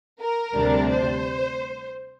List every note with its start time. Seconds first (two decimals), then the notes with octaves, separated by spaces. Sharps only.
0.20 A#4
0.55 D2 C3 G3 D4
0.90 C5